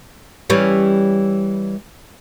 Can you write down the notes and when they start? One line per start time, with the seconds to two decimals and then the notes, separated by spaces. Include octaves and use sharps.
0.50 E3 G3 C#4